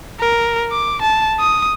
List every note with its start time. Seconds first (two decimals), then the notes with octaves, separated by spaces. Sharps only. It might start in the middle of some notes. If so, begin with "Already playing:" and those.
0.20 A#4
0.72 D6
1.02 A5
1.40 D#6